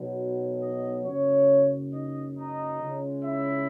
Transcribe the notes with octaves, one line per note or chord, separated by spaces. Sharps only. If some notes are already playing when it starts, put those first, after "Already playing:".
Already playing: B1 B2 F#3
D#4 D#5
F#1 F#2 C#3 C#4 C#5
D#4 D#5
D#4 D#5
C#2 C#3 G#3 C#4
E4 E5